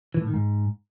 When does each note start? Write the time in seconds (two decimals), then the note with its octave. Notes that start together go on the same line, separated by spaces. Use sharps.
0.14 E3
0.21 A2
0.27 D#3
0.34 G#2